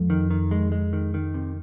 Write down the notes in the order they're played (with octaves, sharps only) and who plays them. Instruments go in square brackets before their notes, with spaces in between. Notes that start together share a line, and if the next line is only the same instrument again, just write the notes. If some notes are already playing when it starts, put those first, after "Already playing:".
Already playing: [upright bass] F2
[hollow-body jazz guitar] D#3
D#3
G#3
G#3
D#3
D#3
C3